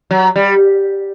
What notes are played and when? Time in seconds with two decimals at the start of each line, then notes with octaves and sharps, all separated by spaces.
0.11 F#3
0.36 G3